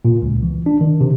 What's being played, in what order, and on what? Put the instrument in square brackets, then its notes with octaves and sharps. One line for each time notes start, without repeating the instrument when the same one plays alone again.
[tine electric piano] A#2
C#2
E3
D4
D#3
C3